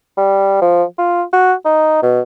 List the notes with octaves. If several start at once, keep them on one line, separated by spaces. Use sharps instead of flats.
G3
F3
F4
F#4
D#4
B2